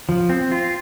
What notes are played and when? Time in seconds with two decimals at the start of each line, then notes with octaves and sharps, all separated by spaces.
0.09 F3
0.29 C4
0.52 F4